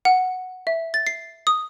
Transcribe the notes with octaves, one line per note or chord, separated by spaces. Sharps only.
F#5
E5
A6
C7
D#6